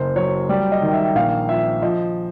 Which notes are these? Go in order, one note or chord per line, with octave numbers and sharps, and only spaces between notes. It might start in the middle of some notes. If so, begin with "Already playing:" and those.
Already playing: F#1 C5
F#3 C#5
G3 D5
D#5
D#3
E5
A#1 F5
F3 E5
F3 D#5